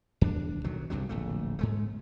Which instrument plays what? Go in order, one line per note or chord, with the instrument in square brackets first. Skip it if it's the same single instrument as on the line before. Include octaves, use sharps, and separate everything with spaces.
[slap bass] E2 D4
B1 D#3 F#3
C2 G2 C3 F#3
D1 A#1 A3
G#2 G#3 A3